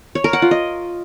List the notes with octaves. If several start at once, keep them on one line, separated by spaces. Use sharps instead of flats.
C#5
A#4
F#5
F4
D#5